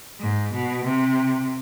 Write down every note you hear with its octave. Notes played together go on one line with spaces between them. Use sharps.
G#2
B2
C3